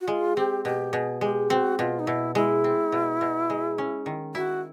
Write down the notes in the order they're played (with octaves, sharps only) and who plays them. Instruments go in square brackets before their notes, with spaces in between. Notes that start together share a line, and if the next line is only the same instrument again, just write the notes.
[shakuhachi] F#4
[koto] G#3 [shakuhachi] F4
[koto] C4 [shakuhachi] G4
[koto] B2 [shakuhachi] G4
[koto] B2 [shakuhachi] G#4
[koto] G#3 [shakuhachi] G4
[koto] C4 [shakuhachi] F#4
[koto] B2 [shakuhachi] F4
[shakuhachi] D#4
[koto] B2 [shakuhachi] E4
[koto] G#3 [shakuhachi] E4
[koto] C4
B2
B2
G#3
C#4
D#3
[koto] E4 [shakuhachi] F#4